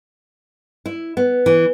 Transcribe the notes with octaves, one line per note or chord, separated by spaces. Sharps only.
E4
B3
E3